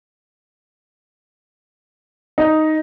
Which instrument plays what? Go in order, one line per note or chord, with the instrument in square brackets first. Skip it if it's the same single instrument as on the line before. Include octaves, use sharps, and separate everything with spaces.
[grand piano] D#4